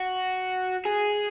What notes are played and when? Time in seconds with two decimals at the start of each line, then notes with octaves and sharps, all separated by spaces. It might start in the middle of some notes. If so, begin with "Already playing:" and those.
Already playing: F#4
0.85 G#4